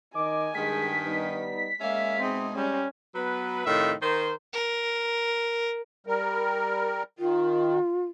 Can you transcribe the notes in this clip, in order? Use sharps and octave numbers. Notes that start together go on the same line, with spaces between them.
D#3 D#5 G#5 D6
G2 D#3 G#3 B6
G3 B3 D#4
G#3 A#3 C#4 E5 F5
B2 C4 D#4 G#4
G3 C#4
F#3 B3 B4
A2 C3 D#3 F4 E5
D#3 A#4 C5
A#4
G3 A#4
D#3 F4